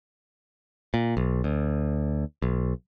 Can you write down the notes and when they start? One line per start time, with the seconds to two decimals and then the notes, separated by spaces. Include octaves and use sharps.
0.94 A#2
1.17 B1
1.44 D2
2.42 B1